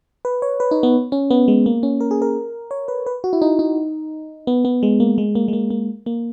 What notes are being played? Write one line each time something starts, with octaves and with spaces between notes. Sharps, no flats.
B4
C#5
B4
D#4
B3
C#4
B3
G#3
A#3
C#4
A#4
G#4
A#4
C#5
B4
B4
F#4
E4
D#4
D#4
B3
B3
G#3
A#3
G#3
A#3
G#3
A#3
A#3
A#3